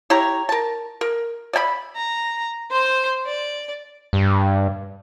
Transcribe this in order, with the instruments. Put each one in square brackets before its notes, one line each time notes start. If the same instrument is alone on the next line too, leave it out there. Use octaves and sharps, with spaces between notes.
[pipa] E4 G4 C#5 A#5
A#4 A5
A#4
D5 E5 G#5 B5
[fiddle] A#5
C5 C6
D5
[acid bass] G2